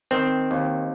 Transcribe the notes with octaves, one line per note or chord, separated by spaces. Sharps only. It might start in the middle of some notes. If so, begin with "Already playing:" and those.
D#3 C4
D#2